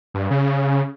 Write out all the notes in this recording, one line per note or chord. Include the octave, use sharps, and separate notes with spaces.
G2
C#3